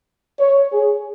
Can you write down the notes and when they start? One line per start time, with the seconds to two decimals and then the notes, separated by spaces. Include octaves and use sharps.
0.39 C#5
0.72 G#4